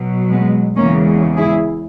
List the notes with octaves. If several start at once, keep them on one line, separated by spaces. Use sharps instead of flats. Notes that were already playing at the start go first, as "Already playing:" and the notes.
Already playing: B2 F#3
G#3 B3
E2 C#3 G#3 A#3 C#4
E4 G#4